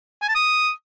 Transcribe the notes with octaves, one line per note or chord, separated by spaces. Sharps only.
G#5
A5
D#6